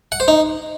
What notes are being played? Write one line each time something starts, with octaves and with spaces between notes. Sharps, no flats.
F#5
C5
D#4